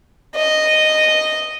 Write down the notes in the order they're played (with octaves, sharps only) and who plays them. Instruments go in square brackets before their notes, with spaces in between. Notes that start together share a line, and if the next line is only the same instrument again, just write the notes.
[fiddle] D#5